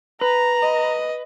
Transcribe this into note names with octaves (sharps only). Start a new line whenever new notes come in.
B4 A#5
D#5